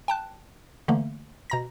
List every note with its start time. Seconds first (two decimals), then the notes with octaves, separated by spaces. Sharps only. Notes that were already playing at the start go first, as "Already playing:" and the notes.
0.08 G5 A5 F#6
0.88 D3 E3 A3 A#3
1.50 B2 A#5 A#6